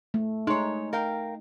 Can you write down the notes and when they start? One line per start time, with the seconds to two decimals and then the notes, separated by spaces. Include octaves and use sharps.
0.14 A3
0.47 G#3 D#4 C#5
0.93 A#4 F5 G5